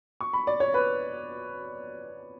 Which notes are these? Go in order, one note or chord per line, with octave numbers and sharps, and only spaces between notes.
C#6
B5
D5
C#5
B4